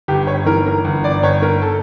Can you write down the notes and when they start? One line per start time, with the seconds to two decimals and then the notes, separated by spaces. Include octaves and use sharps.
0.08 G1 G4
0.27 C#5
0.46 E3 A#4
0.66 A#4
0.85 G1
1.04 D5
1.23 G1 C#5
1.42 A#4
1.62 A4